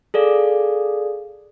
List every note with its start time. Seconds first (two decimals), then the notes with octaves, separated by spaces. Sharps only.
0.14 G#4 A4 D5 F5